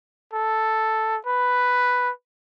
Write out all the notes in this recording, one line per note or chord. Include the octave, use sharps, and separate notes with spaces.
A4
B4